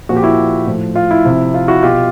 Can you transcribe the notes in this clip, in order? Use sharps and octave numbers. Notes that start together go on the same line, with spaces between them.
A#2 F3 F#4
G4
E4 F#4
A2 F3
F4
E4
C3 F3
F4
E4 F#4
B2 F4 G4